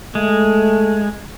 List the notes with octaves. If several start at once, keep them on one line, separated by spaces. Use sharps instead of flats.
G#3 A3